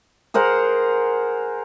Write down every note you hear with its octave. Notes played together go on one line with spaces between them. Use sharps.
G#4 A#4 C5 F#5